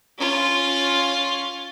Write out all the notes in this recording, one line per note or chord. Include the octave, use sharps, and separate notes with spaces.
C#4 F4